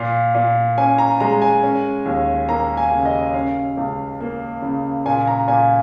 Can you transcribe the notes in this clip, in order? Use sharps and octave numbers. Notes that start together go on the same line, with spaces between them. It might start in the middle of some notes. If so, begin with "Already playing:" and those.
Already playing: A#2 F5
A#2
C#4 G#5
A#5
G#3 A#5
G#5
C#4
D#2
A#3 A#5
G#5
C#3
D#5
C#4 F5
C#2
A#3
C#3
A#2 G#5
A#5
A#2 G#5